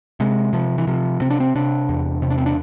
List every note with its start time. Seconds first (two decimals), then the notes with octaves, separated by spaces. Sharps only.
0.20 C3 G#3
0.53 C3 F3
0.78 E3
0.87 C3 F3
1.21 C3 C4
1.30 D4
1.40 C4
1.55 C3 D4
1.89 E2
2.22 C3
2.30 D4
2.38 C4
2.46 D4